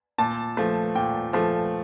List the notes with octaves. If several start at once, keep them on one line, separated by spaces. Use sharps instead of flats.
A#2 A5
F3 A3
A#2 G5
F3 A3